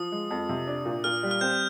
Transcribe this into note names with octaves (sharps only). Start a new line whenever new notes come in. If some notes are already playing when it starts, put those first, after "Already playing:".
Already playing: F3 D#6
G#3
F2
C3
D4
A#2
A#2 F6
G3
F6
C4 G6